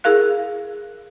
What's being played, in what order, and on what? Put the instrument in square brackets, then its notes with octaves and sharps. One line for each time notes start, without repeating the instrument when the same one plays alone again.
[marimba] E4 G#4 A#4 F5 F#6